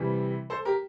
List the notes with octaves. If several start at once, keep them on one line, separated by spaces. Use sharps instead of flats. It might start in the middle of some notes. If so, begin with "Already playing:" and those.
Already playing: C3 E3 G3
A4 C5
G4 A#4